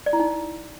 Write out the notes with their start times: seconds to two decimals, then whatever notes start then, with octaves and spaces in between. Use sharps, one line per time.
0.06 D5
0.13 E4
0.20 D#4